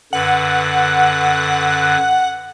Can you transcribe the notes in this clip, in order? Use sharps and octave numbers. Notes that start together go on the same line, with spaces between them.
F#2 D3 B4 F#5